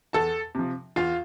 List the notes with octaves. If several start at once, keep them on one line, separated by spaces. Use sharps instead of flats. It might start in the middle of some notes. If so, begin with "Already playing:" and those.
E2 A4 A5
C3 F3
E2 F4 F5